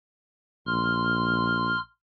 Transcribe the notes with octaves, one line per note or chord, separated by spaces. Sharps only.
A#1 C6 F6